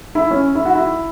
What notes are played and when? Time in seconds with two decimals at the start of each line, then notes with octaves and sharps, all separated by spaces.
0.15 E4
0.31 C#4
0.55 E4
0.65 F#4
0.75 E4